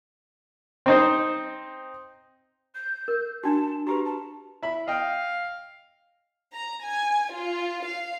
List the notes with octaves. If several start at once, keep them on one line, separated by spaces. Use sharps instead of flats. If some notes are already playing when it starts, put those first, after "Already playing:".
C4 D#4 C5
G6
A#4
D4 F#4 A5
F#4 G4 B4 A#5
A5
E4 B5
D#5 F5 G5
A#5
G#5
F4
F5